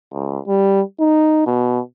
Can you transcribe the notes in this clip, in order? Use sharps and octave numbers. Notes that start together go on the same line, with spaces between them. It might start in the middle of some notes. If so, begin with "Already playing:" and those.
C#2
G3
D#4
B2